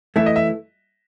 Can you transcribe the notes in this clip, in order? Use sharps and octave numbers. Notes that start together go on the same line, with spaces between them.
E3 A3 E4 E5
D#5
E5